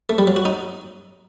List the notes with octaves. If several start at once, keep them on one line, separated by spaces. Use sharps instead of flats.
A3
G3
F#3
F#4
D#4